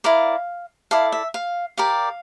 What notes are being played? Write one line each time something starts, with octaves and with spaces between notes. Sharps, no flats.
E4 A#4 D5 F5
E4 A4 D5 F5
E5
F5
G4 A#4 D5 F5